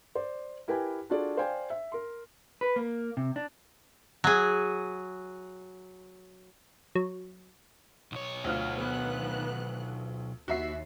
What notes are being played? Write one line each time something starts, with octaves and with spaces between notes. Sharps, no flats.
C5 D5
E4 G4 A#4 B4 G5 G#5
D4 F4 F#4 G#4 A4 D5
C5 D5 F5 G5 G#5
E5
A#4 C6
B4
A#3
C3
D4
F#3 G#4
F#3
B1 C#5
D2 F4 F6
D#3 B3 F#6
D#2 F#4 E5 C7